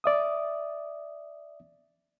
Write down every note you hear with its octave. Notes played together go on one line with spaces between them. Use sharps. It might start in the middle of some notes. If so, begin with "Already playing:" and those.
D5 E5 D#6